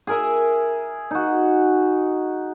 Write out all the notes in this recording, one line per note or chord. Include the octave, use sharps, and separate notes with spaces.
G#4 A#4 E5
D#4 F#4